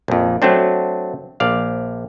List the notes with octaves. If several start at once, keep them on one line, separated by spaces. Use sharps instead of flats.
A#1 F2
F#3 A3 C4 D4
A#1 D5 F5